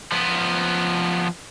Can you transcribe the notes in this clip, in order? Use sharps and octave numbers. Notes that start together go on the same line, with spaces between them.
F3 B3